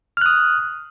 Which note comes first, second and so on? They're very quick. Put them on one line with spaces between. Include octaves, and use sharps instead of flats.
F6 F#6 D#6